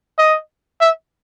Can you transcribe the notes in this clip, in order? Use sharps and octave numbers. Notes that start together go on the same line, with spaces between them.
D#5
E5